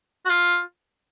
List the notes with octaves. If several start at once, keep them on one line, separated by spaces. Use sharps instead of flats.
F#4
F4